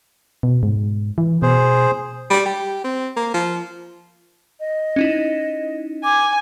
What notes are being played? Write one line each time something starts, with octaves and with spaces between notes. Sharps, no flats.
B2
G#2
E3
B2 G#4 C5
G3
G4
C4
A#3
F3
D#5
C#4 D#4 E4
G#5 D6